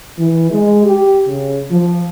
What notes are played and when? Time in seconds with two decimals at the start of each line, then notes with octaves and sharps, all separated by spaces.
0.19 E3
0.51 G#3
0.83 G4
1.27 C#3
1.71 F3